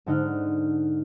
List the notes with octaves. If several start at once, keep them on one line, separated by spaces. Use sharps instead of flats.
G#2 D3 D#4 F#5 F6